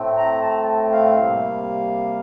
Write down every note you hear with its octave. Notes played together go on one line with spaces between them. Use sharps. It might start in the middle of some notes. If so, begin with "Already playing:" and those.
Already playing: A2 A3 C4
A#5
A5
F5
C3 G3 A#3